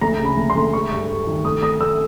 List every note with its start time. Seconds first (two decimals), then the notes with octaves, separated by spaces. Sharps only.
0.01 D2 A#5
0.19 C#3
0.25 B5
0.37 D2
0.50 C6
0.56 D2
0.73 G#3 C#6
0.91 G2
1.08 G2
1.27 D#3
1.45 A3 D#6
1.63 A3 D#6
1.80 A3 E6